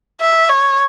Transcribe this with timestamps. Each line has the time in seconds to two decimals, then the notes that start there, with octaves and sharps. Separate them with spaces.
0.21 E5
0.49 C#5